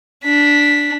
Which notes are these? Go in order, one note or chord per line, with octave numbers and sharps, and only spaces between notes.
D4 B6